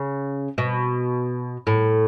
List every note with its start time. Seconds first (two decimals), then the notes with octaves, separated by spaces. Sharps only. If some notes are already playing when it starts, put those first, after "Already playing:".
Already playing: C#3
0.58 B2
1.67 A2